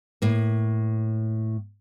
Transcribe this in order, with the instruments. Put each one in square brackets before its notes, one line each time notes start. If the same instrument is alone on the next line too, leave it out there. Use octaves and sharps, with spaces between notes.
[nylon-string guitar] A2 A#3